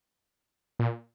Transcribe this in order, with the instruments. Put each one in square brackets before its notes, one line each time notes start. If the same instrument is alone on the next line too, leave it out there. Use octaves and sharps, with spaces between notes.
[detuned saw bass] A#2